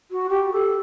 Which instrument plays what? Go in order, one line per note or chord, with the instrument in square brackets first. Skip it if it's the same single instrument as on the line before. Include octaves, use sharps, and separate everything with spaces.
[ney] F#4
G4
A4